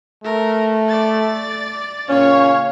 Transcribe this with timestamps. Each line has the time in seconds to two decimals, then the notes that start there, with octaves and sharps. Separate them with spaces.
0.24 A3 A#4
0.88 D5 A6
2.09 A#2 C#3 C#4 C#5 F5